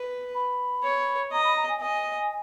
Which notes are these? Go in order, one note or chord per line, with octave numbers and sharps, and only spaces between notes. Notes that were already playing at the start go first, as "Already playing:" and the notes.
Already playing: B4
B5
C#5
D#5 A#5
B5
A#5
G#5
D#5 G#5